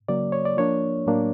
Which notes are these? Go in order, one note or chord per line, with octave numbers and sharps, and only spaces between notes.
C#3 F#3 A#3 D5
C#5
D5
F3 A#3 D4 C#5
A2 F#3 A#3 D4